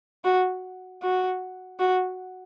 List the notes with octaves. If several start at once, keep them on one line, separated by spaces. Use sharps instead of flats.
F#4
F#4
F#4